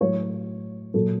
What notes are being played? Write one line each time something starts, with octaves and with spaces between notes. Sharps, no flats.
A2 F#3 C#5
A#2 F#3 A4